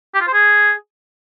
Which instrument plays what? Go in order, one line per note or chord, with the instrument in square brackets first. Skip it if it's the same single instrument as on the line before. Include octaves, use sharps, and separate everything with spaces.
[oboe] G4
F4
C5
G#4